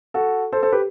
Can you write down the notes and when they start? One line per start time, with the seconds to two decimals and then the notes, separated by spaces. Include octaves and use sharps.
0.14 F#4 A4
0.52 A4 C5
0.63 A4 C5
0.72 G4 B4